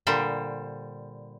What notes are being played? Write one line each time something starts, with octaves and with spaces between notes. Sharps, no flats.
A#2 D3 G3 C5